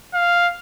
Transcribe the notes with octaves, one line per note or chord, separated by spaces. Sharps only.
F5